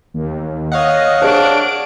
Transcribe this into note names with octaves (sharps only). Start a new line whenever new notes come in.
D#2
C#5 D#5 F5 F#5
D4 G#4 C5 D7